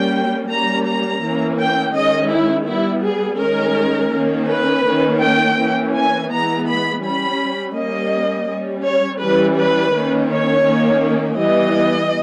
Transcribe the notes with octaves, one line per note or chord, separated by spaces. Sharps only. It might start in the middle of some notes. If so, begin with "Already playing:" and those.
Already playing: G3 A#3 C#4 G5
G3 A#3 C#4 A#5
A#5
E3 A#3 C#4
G5
D#3 G#3 C#4 D#5
E4
G3 B3 E4
G#4
D#3 G#3 C#4 A#4
D#3 A#3 C#4
B4
D#3 A#3 C#4
G5
E3 A#3 C#4
G#5
E3 G#3 B3 A#5
B5
G3 C#4 B5
G3 A#3 C#4 D#5
G3 C#4
C#5
E3 G3 C#4 B4
B4
D#3 A#3 C#4
C#5
D#3 A#3 C#4
E3 G3 B3 D#5